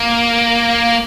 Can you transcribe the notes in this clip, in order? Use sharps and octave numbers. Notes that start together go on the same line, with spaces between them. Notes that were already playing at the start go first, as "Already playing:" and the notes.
Already playing: A#3